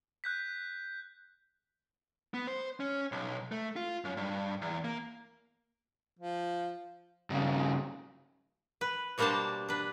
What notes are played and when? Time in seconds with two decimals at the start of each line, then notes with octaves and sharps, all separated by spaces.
0.24 F#6 G6 B6
2.34 B3
2.47 C5
2.80 C#4
3.12 B1
3.52 A3
3.76 F4
4.05 F#2
4.17 G2
4.61 E2
4.84 A#3
6.19 F3
7.30 G2 C#3
8.81 B4
9.18 B2 G3 A#3 D4 C5 A5
9.69 D4 B4